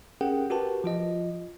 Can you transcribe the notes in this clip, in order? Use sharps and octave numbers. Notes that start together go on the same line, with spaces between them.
C#4 G4 G#4 A#4 F#5 G5
F#4 G4 A#4 B4 A5
F3 F4 D#5